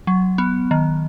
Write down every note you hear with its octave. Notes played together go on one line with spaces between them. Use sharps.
F#3
B3
D#3